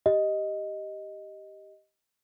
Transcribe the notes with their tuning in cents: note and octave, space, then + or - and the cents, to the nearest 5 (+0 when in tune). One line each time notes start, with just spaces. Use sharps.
G4 +0 D#5 +0